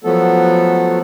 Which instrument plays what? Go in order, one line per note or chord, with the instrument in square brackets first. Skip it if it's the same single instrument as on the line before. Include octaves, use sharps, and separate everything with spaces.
[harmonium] F3 F#3 A3 B3 A4